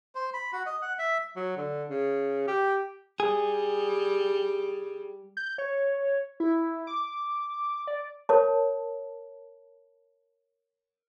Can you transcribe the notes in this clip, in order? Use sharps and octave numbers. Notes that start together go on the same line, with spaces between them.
C5
B5
F#4
D#5
F#5
E5
F#3
D3
C#3
G4
G3 G#4
G6
C#5
E4
D6
D5
A#4 C#5 A5